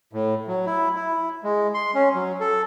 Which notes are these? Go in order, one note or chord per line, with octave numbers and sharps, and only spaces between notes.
A2
F#3
E4
E4
G#3
C6
C#4
F#3
A4